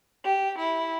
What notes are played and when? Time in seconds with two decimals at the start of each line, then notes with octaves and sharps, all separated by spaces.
0.23 G4
0.56 E4